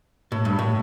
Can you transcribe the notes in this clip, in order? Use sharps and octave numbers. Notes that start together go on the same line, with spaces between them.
A2
G2
A2